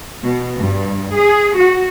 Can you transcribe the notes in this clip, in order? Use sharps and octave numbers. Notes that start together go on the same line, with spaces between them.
B2
G2
G#4
F#4